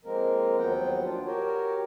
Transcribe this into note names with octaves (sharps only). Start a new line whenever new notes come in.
F3 G#3 A#3 C4 A#4
D#2 F3 F#3 B3 F#5 G5
D4 F4
F#4 G4 A#4 C#5